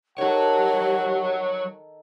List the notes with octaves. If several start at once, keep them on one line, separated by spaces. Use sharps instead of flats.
D#3 F#3 G4 A4 C#5 F#5